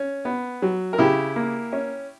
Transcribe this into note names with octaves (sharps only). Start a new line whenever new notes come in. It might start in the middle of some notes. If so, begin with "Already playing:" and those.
Already playing: C#4
B3
F#3
A#4
C#3 E4 G4
A#3
C#4